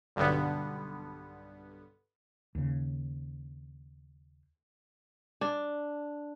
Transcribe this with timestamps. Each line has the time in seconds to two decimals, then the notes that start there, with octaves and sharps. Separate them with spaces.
0.16 B1 G2 D3 B3
2.55 D#2 C#3
5.41 D4